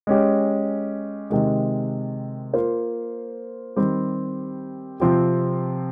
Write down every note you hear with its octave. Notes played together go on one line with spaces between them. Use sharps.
G#3 C#4 G4
C3 D#3 G#3
A#3 F4 C5
D#3 G3 C4 G4
C3 F3 C4 G4